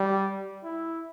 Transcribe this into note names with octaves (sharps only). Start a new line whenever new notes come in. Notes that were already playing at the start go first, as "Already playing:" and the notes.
Already playing: G3
E4